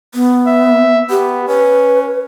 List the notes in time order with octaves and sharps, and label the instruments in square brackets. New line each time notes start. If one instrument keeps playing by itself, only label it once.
[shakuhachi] B3
[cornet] E5
[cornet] B3 [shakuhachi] G4
[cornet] C#4 [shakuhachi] B4